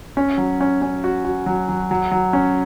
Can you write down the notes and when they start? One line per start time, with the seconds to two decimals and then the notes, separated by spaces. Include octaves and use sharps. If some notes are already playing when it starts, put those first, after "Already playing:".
0.17 C#4
0.38 F#3
0.61 C#4
0.82 C#4
1.04 F#4
1.25 F#4
1.46 F#3
1.69 F#3
1.91 F#3
2.11 F#3
2.33 C#4